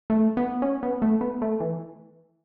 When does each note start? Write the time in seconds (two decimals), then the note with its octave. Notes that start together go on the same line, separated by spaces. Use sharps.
0.10 A3
0.37 B3
0.62 C#4
0.83 B3
1.02 A3
1.21 B3
1.42 A3
1.60 E3